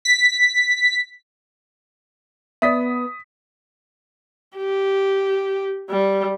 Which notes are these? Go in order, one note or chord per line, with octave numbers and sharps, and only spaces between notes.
B6
B3 D5 E5 D#6 B6
G4
G3